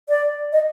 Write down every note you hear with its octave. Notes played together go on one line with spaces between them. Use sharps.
D5
D#5